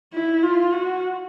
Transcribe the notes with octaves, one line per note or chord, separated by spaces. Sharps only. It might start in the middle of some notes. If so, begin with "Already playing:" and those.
E4
F4
F#4